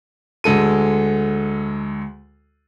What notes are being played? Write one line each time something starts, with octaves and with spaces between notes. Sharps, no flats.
D2 G#3 A4 D#7